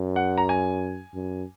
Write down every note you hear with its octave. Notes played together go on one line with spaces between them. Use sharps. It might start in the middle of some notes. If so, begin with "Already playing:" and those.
Already playing: F#2
F#5
A#5
G#5
F#2